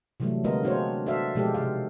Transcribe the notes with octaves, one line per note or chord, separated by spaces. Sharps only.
C3 E3 F#3 G3 A3
D3 G#3 B3 F4 A#4 D#5
C4 D4 F4 F#4 C5 C#5
F#4 A4 C5 D5 E5 F5
B2 D#3 F3 G#3 G4 A4
C3 F5